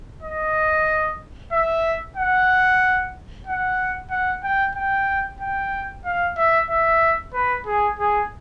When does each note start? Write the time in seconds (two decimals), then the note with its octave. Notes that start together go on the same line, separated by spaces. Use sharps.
0.23 D#5
1.53 E5
2.17 F#5
3.47 F#5
4.11 F#5
4.44 G5
4.75 G5
5.41 G5
6.06 F5
6.37 E5
6.70 E5
7.34 B4
7.67 G#4
7.99 G#4